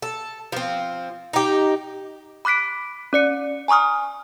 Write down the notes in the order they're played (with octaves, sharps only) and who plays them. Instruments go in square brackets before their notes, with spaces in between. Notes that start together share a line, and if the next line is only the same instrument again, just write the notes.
[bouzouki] A4
F3 C4
D#4 G4
[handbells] B5 D6 F#6 B6 D7
C#4 D5 C#7
G#5 A#5 C#6 D#6 F6